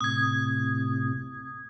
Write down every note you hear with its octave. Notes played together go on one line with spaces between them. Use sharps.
A2 C3 D#6 G#6